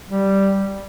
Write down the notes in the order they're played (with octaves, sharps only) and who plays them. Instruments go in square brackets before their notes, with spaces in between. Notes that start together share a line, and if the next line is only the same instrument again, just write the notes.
[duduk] G3